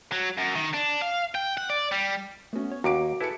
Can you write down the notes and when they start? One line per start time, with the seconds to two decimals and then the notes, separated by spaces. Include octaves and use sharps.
0.12 F#3
0.38 F#2
0.55 D#3
0.73 D4
1.01 F5
1.35 G5
1.57 F#5
1.70 D5
1.92 G3
2.53 A3 B3 C#4 F#4
2.72 C#5
2.84 D#2 F#4 A#5 D6 D7
3.21 E4 G#4 A4 B4 A5 C#7